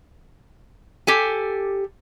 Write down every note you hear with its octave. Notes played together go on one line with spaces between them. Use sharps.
G4 A4 G#5